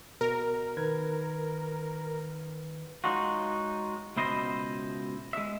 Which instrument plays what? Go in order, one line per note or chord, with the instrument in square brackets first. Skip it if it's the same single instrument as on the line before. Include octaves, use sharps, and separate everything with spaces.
[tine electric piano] B2 [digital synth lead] A#4
[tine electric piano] D#3 B4 G#6
[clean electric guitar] F#3 G#3 D#4 F4 F#4
C#2 B2 E4 C5 D#5
G#3 E5